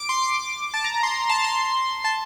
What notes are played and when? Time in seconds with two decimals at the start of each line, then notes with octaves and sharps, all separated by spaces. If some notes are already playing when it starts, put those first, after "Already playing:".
Already playing: D6
0.09 C6
0.23 D6
0.74 A5
0.84 A#5
0.94 A#5
1.03 C6
1.29 A5
1.44 C6
2.04 A5